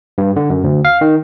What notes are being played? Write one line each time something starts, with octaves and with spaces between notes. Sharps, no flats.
G2
D3
F#2
D2
F5
D#3